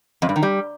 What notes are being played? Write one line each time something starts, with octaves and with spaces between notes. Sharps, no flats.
F2
G2
D#3
G3